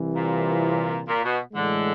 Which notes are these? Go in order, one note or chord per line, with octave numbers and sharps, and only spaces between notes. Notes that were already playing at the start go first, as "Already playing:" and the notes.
Already playing: C2 C3 E3
A#2
A#2
B2
A2 D3 E3 G#3